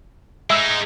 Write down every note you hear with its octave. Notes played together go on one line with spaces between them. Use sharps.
G#3 D#4 E5 E6